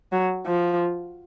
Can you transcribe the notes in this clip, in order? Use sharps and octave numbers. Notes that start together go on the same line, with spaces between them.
F#3
F3